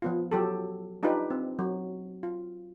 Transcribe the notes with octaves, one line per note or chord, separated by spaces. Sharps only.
F3 B3 F4
F#3 G4 A4
D4 D#4 F4 G4 B4
C4
F#3
F4